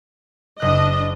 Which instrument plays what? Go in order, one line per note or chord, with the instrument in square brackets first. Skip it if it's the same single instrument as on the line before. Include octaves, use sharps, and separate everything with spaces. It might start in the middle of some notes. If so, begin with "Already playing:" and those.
[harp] F#1 F#6 [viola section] D4 D#5